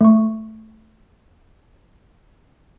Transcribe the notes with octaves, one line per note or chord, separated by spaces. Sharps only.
A3 C#6